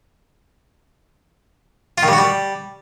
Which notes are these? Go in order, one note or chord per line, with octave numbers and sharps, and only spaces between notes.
F4
D#3
G3
F#4
G3